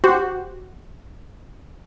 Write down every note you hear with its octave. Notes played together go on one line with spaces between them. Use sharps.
F#4 G4 C5